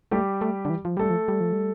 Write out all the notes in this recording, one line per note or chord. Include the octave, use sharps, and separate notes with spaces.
G3 A3 G4
A3
D3
E3
F3
G3 A3 A4
F3
G3
F3
G3